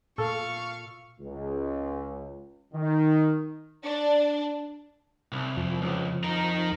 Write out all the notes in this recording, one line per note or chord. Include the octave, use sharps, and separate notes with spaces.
A#2 A4 F5 C#6
C#2
D#3
D4
C2
F2 F3
C#2
D#4 A#4